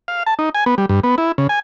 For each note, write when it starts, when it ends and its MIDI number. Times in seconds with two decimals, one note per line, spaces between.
0.08 0.23 77
0.27 0.34 81
0.39 0.49 63
0.55 0.64 80
0.66 0.75 59
0.78 0.86 55
0.89 1.00 43
1.04 1.15 59
1.18 1.32 64
1.38 1.47 49
1.49 1.59 80